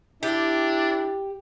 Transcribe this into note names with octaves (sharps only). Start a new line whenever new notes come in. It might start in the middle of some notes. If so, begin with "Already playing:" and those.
D4 E4 G4